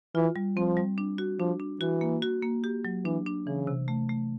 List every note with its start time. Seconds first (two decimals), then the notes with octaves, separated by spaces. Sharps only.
0.15 E3 F4
0.36 G3
0.56 F3 C4
0.77 G3
0.98 D4
1.18 F#4
1.40 F3 D4
1.60 D4
1.81 E3 F#4
2.01 A#3
2.22 F#4
2.43 A#3
2.64 G4
2.85 F#3
3.05 E3 D4
3.26 D4
3.47 C#3 E3
3.67 C3
3.88 A3
4.09 A3